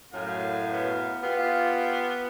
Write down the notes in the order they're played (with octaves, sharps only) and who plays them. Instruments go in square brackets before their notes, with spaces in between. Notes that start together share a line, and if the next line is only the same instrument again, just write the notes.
[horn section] F#2 A2 F5
[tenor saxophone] B3
[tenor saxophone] B3 [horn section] F4 G4